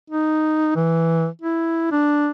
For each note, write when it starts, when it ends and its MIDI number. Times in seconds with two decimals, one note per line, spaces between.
0.11 0.74 63
0.76 1.27 52
1.42 1.88 64
1.92 2.30 62